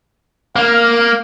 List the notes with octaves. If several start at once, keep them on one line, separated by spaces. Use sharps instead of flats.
A#3 F5